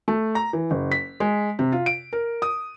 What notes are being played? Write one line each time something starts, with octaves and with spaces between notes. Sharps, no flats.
A3
A#5
E3
F#1
B6
G#3
C3
F4
D7
A#4
D#6